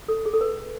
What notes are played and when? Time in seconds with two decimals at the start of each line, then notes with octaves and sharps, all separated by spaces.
0.08 A4
0.26 G#4
0.34 A4
0.41 B4